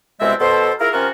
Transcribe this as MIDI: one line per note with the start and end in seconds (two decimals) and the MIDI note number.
0.20 0.33 36
0.20 0.33 47
0.20 0.33 56
0.20 0.33 60
0.20 0.33 76
0.39 0.72 47
0.39 0.72 69
0.39 0.72 72
0.80 0.89 64
0.80 0.89 65
0.80 0.89 68
0.80 0.89 70
0.93 1.08 48
0.93 1.08 53
0.93 1.08 61
0.93 1.08 65
0.93 1.08 66
0.93 1.08 70